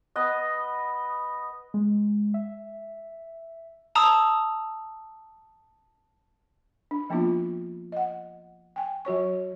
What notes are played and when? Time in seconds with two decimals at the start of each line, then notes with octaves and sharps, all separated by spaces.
0.16 B3 B4 D#5
1.74 G#3
2.34 E5
3.95 A5 A#5 D#6 E6
6.91 D4
7.10 F3 A#3 B3 D4 E4 F4
7.92 D#5 F#5
8.76 G5 G#5
9.05 F#3 F#4 C#5 C#6